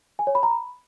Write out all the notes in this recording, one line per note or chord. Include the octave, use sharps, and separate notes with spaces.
G#5
C#5
B5
A#5
B5